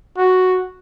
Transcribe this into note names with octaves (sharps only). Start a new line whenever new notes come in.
F#4